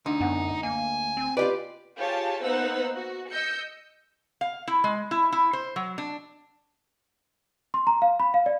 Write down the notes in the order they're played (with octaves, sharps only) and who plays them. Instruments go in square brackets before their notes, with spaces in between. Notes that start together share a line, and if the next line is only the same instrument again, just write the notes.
[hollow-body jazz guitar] D2 [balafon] D4 [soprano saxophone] D#4
[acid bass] F#2 [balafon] B3 F#5
[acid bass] A#3 [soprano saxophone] G#5
[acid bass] C4
[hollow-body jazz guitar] F4 G4 B4 [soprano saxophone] D5 [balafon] D#5
[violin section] F4 G4 G#4 C#5 A5
A#3 B3 D#4 C5 F#5 E6
F#4
D#5 E6 G6 C#7
[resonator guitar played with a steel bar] F5
E4
G#3
E4
E4
C5
F#3
D4
[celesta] C6
A#5
F5
B5
F5
D5